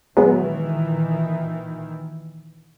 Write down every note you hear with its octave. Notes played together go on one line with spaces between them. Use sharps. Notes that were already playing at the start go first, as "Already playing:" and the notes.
A#2 D#3 E3 F#3 G#3 B3